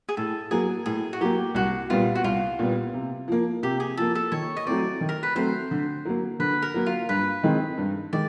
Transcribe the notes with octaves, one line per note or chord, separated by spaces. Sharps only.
G#4
A2 A4
F#3 A#3 G#4
A2 G#4
F#4
F#3 A#3 G4
C2 F#4
A#2 G3 B3 F4
F#4
C2 F4
A#2 G3 B3
C3
F3 A#3
C3 G4
G#4
F3 A#3 A4
A4
D#3 C#5
D#5
F#3 A3 C4 D5
D#3
A#4
B4
F#3 A3 C4 C5
D3
F#3 A#3
D3 B4
A#4
F#3 A#3
F4
G2 B4
D#3 G#3 C4 D#4
G2
D#3 G#3 D5